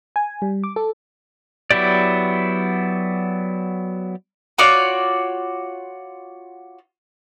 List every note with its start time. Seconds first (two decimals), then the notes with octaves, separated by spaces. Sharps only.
0.16 G#5
0.42 G3
0.64 D6
0.76 A4
1.71 F#3 B3 E4 G4 D5
4.58 F4 F#4 C#5 D5